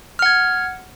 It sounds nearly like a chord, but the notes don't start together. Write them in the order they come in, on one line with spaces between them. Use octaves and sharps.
F6 F#5 G#6